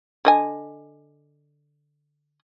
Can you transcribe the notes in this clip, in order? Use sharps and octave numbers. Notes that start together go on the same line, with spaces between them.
D3 D#5 G#5